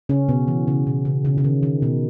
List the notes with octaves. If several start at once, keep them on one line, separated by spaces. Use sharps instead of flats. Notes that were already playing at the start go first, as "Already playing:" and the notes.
C#3 C#4
B2 B3
E3
C#3
B2
C#3
C#3
C#3
D#3
D#3
B2